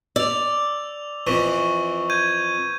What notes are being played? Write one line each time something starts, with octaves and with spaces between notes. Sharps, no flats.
D5 E6 F7
F2 E3 C#6
G6 G#6 D#7